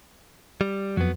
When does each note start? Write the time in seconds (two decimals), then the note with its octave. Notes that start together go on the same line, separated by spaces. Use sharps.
0.61 G3
0.97 F2 F#3 B3